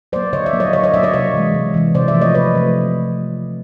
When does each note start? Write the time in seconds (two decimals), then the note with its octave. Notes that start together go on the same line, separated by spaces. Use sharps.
0.13 F#3 A#3 C5 D5
0.33 D3 C#5 D#5
0.46 D5 E5
0.53 F#3 A#3
0.60 C#5 D#5
0.73 D3 C#5 D#5
0.83 C#5 D#5
0.93 F#3 A#3 D5 E5
1.03 C#5 D#5
1.14 C3 C#5 D#5
1.34 E3 G#3
1.54 C3
1.74 E3 G#3
1.95 C3 C5 D5
2.08 D5 E5
2.14 F3 A3
2.21 C#5 D#5
2.35 C3 B4 C#5
2.55 F3 A3